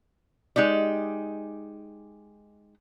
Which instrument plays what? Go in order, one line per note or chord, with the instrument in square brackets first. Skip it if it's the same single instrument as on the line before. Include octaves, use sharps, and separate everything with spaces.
[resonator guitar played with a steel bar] G#3 D#4 G4 D5